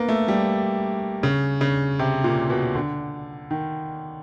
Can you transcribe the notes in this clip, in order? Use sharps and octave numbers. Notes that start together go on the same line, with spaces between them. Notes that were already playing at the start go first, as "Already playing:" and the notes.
Already playing: A#3 B3
A3
G3
C#3
C#3
C3
A#2
B2
D3
D#3